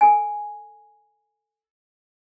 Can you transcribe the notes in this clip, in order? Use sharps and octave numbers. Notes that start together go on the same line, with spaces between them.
A4 G#5